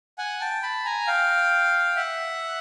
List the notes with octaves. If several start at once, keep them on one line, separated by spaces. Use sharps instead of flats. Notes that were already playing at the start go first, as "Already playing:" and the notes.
F#5 G#5
G5 A5
A5 B5
G#5 A#5
F5 G5
E5 F#5